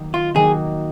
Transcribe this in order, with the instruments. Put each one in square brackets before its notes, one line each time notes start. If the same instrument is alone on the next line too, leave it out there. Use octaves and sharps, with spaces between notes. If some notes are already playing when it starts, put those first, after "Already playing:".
Already playing: [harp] D#3 F#3 A#3 D#4 F#4
[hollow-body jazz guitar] F4
[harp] D#3 F#3 A#3 D#4 F#4 [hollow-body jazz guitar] G#4